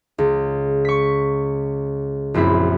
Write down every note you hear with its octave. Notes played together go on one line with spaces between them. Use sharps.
C#2
C#6 B6
A#1 F#2 C4 E4 B5